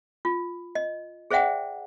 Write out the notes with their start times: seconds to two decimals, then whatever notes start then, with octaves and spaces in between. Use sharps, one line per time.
0.25 F4
0.75 D#5
1.31 G#4 C5 D5 E5 F#5 G5